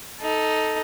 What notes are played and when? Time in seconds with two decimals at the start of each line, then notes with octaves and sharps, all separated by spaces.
0.21 D#4 A4